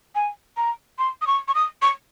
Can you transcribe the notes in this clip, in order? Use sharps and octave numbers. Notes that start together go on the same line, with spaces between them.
G#5
A#5
C6
D#6
C#6
C#6
D#6
C#6